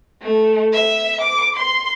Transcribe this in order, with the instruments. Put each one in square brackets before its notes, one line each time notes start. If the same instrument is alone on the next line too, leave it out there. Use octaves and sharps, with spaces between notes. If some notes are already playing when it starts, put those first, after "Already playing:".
[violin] A3
E5
D6
C6